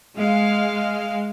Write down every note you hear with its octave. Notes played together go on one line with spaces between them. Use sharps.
G#3 F5